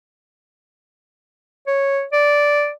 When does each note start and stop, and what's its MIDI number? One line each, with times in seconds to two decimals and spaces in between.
1.67 2.04 73
2.13 2.70 74